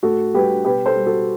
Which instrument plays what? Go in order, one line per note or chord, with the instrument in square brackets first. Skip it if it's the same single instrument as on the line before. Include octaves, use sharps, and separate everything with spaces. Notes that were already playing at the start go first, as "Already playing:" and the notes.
[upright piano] A2 F#4 A4
G3 G4 B4
B2 G4 B4
A4 C5
G3
F#4 A4